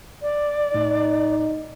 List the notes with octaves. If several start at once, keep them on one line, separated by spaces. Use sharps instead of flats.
D5
A2 D#4